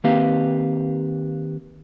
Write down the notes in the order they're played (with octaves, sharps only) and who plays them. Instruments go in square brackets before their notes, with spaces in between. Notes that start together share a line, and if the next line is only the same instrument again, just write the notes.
[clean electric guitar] D#3 A#3 C4 G4 B4 F5